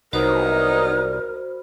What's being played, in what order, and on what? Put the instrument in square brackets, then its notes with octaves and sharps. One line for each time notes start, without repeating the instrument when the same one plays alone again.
[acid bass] C2 [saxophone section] F#3 B3 D#4 [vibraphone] F#4 C5 B5 [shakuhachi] A#4